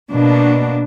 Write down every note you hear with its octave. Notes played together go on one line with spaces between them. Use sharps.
B2 A#3 D4